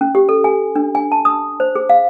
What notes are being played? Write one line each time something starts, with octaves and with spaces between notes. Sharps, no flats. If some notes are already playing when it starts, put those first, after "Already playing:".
C#4
G4
A4
G#5
D4
G#5
A5
D#6
C5
G#4
F5